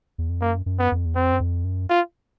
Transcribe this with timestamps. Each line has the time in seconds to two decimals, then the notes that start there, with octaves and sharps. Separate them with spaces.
0.18 E2
0.29 F2
0.41 F#2 A#3
0.66 F#2
0.79 B3
0.92 F2
1.06 E2
1.15 F2 C4
1.33 F#2
1.40 F2
1.64 F#2
1.90 F4